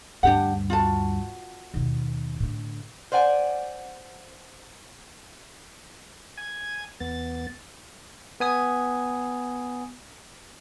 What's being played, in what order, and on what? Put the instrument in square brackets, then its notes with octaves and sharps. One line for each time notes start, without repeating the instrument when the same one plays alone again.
[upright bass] D2 G2 [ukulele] D4 G4 F#5
[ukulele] F4 F#4 A5
[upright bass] D#2 B2
A2 D3
[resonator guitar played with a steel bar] C5 D5 F#5 G#5
[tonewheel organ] G#5 G#6
E2 B3 A6
[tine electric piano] B3 G#5 D#6